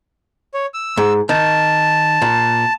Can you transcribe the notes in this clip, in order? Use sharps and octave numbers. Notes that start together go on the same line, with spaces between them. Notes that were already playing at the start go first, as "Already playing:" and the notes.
C#5
E6
G#2
D#3 A5
A#2